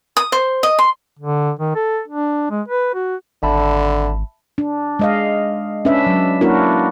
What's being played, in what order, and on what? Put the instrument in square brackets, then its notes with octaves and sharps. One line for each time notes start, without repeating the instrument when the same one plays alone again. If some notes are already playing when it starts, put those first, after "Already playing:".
[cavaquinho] D#6
C5
D#5
C6
[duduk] D3
D#3
A4
D4
G#3
B4
F#4
[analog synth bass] G#1 [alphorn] D3 [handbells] E5 A5 B5
[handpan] D4
G#3 D#5 F5
C#4 D4 B4 E5
F#3
A#3 D4 E4 F#4 A#4